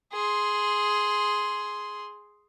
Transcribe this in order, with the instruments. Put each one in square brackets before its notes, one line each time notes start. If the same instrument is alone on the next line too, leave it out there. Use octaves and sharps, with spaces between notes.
[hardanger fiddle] G#4 C6